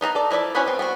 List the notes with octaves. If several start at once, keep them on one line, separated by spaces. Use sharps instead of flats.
B3 D#4 A5 A#5
A4 D5
F3 E4 A4 D5 E5
C#4 E4 F#4 B4 C5
B3 C4
B3 C4 F#4